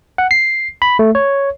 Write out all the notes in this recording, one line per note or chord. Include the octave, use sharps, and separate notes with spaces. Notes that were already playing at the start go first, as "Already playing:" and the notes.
F#5
C7
B5
A3
C#5